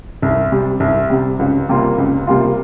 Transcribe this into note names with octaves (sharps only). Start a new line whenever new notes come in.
C2
C3 G3
C2
C3 G3
C#2
C3 G3 A#3 F4
C#2
C3 G3 A#3 F4